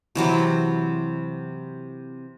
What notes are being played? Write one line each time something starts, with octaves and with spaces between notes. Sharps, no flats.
C3 E3 F#3 C4